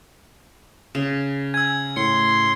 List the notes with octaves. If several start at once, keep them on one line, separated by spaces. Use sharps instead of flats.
C#3
G#5 E6 G#6
A2 C6 C#7